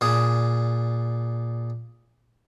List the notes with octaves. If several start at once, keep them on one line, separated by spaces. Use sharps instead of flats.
A#2 D4 G#4